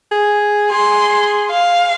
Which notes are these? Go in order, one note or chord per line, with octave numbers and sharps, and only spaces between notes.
G#4
G#4 C6
F5